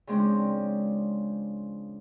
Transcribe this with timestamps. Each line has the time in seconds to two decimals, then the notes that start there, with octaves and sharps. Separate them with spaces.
0.07 C#3 F3 G#3 C4 D4